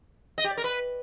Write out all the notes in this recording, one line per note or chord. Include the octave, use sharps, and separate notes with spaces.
D#5
G4
D5
A#4
B4